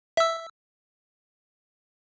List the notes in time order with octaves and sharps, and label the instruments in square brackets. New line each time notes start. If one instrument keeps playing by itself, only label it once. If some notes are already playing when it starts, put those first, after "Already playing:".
[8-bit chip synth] E5 E6